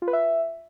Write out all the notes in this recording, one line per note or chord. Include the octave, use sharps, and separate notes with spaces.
F4
B4
E5